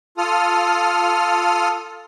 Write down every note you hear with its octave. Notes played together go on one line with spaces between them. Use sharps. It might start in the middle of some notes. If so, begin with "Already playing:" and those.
F4 A4 D#6 F6